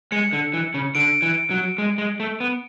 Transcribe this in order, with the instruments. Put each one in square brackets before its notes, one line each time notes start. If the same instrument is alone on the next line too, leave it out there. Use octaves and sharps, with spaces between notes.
[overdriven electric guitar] G#3 [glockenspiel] C#7
[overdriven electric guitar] D3
E3
C#3
[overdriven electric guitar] D3 [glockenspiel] D7
[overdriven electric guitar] E3
F#3
G#3
G#3
A3
B3